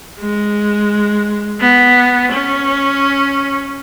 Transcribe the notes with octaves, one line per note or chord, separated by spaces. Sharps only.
G#3
B3
C#4